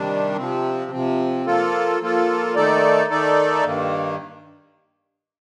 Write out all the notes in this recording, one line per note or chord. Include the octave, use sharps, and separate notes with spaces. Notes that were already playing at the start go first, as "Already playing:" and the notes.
Already playing: C3 D#3 G3 D4
C3 F3 C4
C3 F3 C4
F3 A#3 F4 A4
F3 A#3 F4 A4
D#3 A3 D#4 A4 D5
D#3 A3 D#4 A4 D5
G2 D#3 A#3